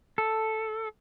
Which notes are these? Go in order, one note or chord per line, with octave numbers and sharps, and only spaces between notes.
A4